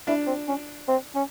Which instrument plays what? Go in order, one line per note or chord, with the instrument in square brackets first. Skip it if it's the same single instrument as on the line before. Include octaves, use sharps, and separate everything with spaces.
[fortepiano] D4 [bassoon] E4
[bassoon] C4
C#4
C4
C#4